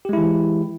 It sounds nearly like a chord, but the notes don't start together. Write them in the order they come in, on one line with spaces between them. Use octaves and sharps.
G4 G#3 E4 E3